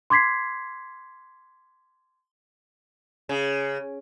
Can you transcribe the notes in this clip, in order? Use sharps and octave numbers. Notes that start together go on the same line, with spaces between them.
C6 D6 G#6 B6 C7
C#3